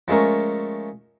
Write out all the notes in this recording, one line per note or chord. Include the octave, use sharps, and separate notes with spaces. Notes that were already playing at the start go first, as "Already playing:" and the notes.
F3 G#3 A3 C#4 A#4